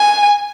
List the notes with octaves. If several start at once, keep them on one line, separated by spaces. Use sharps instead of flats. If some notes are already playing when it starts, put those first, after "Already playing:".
Already playing: G#5